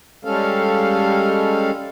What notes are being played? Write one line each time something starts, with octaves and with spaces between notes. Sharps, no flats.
G3 G#3 C#4 A4 F5